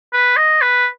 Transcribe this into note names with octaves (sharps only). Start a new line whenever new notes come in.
B4
D#5
B4